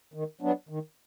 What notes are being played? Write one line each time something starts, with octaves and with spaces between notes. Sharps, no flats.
D#3
F#3 B3 D4
D#3